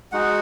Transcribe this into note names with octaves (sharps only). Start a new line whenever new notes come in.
G#3 D#4 F#4 F#5